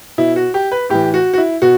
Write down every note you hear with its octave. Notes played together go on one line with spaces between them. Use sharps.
B2 E4
F#4
G4
B4
A2 E3 G4
F#4
F#4
E4
B2 F#4